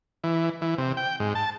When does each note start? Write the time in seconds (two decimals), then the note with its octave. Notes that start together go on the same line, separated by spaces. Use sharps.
0.24 E3
0.61 E3
0.78 C3
0.97 G5
1.20 G#2
1.35 A5